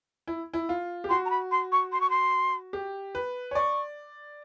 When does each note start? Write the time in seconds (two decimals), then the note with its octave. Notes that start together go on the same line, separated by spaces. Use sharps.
0.27 E4
0.54 E4
0.69 F4
1.04 G4
1.09 F#4 C6
1.25 A#5
1.30 B5
1.51 C6
1.72 C#6
1.92 C6
2.01 C#6
2.10 C6
2.73 G4
3.15 B4
3.51 C#5
3.55 D5 C#6